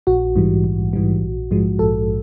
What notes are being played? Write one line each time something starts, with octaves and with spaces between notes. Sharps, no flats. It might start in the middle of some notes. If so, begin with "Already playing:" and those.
A#1 F#4
G#2 E3 G3
A#1
G#2 E3 G3
A#1
G#2 F3 G#3
A#1 A4